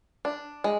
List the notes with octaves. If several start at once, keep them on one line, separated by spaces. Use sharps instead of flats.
D4
G#3